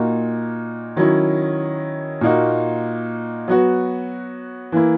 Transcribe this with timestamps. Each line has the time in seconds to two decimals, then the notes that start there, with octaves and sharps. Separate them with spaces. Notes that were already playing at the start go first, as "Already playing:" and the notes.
Already playing: A#2 A#3 D#4 F#4
0.96 D#3 F#3 C#4 E4
2.21 A#2 A#3 D#4 F#4
3.48 F#3 B3 F#4
4.72 E3 A#3 E4